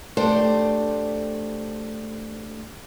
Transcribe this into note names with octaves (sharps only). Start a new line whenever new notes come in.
A3 D4 G4 C5